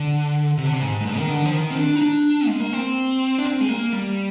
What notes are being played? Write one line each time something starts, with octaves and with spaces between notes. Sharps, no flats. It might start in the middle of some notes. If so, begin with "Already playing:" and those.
Already playing: D3
C3
D3
C3
G#2
G#2
G2
D#3
D3
F3
D#3
C4
D4
D#4
D4
G#3
A#3
C4
D4
C4
G#3
A#3
G3